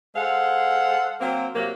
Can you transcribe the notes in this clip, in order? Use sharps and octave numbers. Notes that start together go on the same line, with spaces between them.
G#3 A4 C5 F5 F#5
F#3 A#3 C4
C3 F#3 A#3